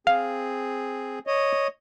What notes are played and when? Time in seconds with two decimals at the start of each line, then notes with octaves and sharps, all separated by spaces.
0.07 C4 G#4 F5
1.27 C#5 D#5